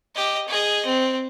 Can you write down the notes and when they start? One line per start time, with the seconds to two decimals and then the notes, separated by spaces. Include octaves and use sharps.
0.15 G4 D#5
0.48 G#4 D#5
0.86 C4